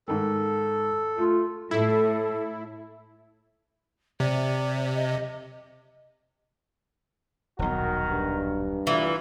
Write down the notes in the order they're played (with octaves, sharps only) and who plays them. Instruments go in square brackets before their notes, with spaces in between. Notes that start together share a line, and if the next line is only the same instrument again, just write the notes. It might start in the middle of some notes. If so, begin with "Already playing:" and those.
[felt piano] G#2 D#3 [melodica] A4
[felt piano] A3 [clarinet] F4
[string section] A2 [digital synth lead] E4 [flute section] A4
[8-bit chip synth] C3 [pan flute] D5
[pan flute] D#5
[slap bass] D#1 B1 [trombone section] D#3 F#4 A#4
[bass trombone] G2
[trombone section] D2 A#2 [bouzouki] E3